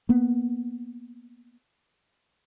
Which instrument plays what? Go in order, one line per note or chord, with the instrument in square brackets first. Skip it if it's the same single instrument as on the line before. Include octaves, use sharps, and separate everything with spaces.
[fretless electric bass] A#3 B3